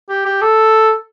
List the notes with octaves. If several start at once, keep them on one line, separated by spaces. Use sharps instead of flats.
G4
G4
A4